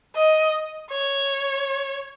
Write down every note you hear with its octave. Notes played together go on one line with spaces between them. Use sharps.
D#5
C#5